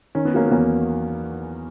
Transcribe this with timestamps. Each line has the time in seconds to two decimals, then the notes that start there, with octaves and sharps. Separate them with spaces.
0.15 D#3 C#4
0.25 B3
0.34 F#3 A#3 C#4
0.46 B3
0.51 E2 A#3 C#4